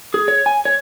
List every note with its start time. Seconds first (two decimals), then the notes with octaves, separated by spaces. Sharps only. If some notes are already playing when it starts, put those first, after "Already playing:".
0.14 G#4
0.28 C#5
0.46 G#5
0.65 C#5